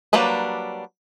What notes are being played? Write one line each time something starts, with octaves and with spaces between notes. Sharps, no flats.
F#3 G3 A#3 D4 B4